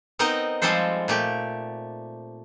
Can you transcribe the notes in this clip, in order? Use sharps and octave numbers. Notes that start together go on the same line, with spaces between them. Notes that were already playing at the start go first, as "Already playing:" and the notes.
B3 C4 D#4 A#4 D#5
F3 G3 G#3 C4 A4 C5
A#2 A3 G4